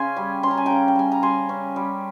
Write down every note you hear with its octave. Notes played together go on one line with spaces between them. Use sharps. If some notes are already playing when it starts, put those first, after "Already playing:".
Already playing: C#3 C#4 G#5 C6
G3
C#4 C6
A#5
G#5
C#3 G5 A#5
G5
G3 G#5
A#5
G3 G#5 C6
C#4
G3